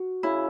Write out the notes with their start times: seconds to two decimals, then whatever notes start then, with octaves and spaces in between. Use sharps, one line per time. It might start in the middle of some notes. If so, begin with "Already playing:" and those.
Already playing: F#4
0.23 C#3 E4